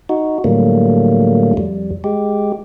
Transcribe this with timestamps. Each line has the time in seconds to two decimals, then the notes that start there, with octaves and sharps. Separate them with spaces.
0.09 D#4 F#4
0.44 A2 D3 F#3 G3 A3 A#3
1.57 F2 G3
2.04 G#3 G4